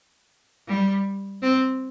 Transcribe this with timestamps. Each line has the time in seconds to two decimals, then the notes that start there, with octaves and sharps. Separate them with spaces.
0.68 G3
1.42 C4